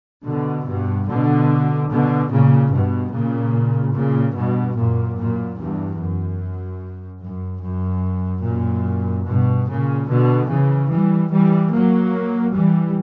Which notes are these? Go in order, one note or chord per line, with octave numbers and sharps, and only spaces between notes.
B2 D3
G2 B2
B2 D3
B2 D3
A#2 C#3
G2 B2
A#2 C#3
A#2 C#3
G2 B2
F#2 A#2
F#2 A#2
E2 G2
F#2
F#2
F#2
F#2 A#2
G2 B2
A#2 C#3
B2 D3
C#3 E3
E3 G3
E3 G3
F#3 A#3
E3 G3